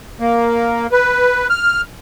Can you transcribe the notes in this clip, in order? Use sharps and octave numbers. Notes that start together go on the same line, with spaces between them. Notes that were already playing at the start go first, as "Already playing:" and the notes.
A#3
B4
F6